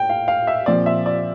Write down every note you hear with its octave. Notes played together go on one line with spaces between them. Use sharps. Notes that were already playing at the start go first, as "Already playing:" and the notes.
Already playing: A2 G5
F5
F5
E5
A#2 F3 C4 D5
E5
D5